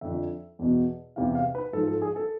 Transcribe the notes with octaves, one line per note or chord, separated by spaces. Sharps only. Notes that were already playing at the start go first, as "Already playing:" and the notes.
F2 D3 F3 E5
E2 B2
E2 C3 E3 F5
F5
B4
G#2 F3 A4
A4
G#4
A4